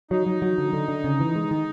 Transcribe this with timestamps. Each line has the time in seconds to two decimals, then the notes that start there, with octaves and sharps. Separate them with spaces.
0.11 F#3 D#4
0.26 F#3
0.42 F#3
0.58 D3
0.73 D3
0.88 D3
1.04 C#3
1.20 E3
1.36 G#3
1.51 D#3